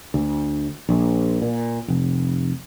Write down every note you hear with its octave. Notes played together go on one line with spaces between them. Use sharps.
D2
A#1
A#2
F1